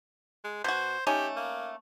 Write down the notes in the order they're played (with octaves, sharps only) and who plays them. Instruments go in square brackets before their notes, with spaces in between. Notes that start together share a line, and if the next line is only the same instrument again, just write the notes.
[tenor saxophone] G#3
[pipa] B2 F#4 [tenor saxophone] C5
[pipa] A3 C#4 D#4 [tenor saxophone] G4
[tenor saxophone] A#3